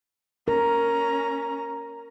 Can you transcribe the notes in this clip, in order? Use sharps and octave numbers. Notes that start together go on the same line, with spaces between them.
C#4 A#4 A#5